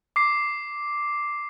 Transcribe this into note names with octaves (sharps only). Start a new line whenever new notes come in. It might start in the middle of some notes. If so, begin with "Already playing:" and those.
D6 C7